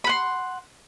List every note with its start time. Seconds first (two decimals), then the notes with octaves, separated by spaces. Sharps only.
0.04 B5
0.07 F#5
0.09 C6